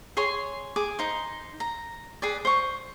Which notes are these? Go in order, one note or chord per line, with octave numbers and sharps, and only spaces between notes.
G#4 C#5 C6
G#4 D6
D#4 C5
A#5
G#4 B4 D5
C5 C#6